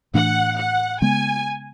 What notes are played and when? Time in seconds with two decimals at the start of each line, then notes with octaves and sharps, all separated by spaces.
0.14 A2 E3 A3 D4 F#5
0.58 F#5
1.01 C#3 G#3 B3 G#5